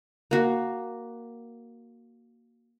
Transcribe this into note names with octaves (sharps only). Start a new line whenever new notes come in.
A#3 F#4